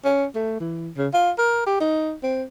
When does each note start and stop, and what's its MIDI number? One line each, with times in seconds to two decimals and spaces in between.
0.05 0.25 61
0.35 0.56 57
0.60 0.90 52
0.97 1.08 49
1.13 1.31 65
1.38 1.63 70
1.67 1.80 67
1.80 2.13 63
2.23 2.44 60